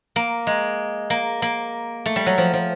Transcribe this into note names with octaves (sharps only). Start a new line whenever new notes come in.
A#3
G#3
A#3
A#3
A3
G3
F#3
F3
F3